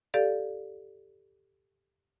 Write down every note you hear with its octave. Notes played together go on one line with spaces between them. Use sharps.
G4 A4 D5 F5